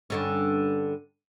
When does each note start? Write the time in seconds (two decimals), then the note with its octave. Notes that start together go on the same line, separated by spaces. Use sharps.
0.10 G2 D3 C#4